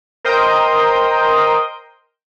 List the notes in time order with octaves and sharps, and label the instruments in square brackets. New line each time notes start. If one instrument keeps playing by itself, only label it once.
[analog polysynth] A#4 C5 D#5 G5 D#6 G6